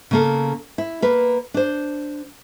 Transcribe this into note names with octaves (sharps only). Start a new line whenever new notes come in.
C#3 A#3 A4
E4
A#3 B4
D4 C5